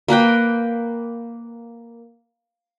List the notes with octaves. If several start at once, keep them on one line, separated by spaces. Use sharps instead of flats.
A#3 A#4 B4 G5